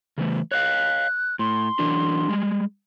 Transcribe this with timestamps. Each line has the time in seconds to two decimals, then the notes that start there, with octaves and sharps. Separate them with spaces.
0.18 C#3 E3 A3
0.51 C#5 D#5 F5 F#6
1.39 A2 C6
1.79 E3 F#3 D4
2.29 G3 G#3